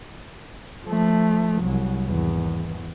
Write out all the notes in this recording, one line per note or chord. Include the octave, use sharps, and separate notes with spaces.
F3 A3
C2 F#3
G#1 E2